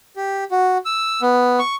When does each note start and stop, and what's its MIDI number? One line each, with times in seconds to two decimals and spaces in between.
0.16 0.44 67
0.51 0.78 66
0.85 1.21 88
1.22 1.59 59
1.59 1.76 85